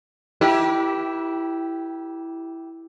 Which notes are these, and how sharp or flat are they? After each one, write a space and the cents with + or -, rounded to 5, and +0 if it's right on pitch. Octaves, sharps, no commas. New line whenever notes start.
E4 +0 G4 -10 B4 -45